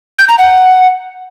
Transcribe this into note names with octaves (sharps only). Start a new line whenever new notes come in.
G6
A#5
F#5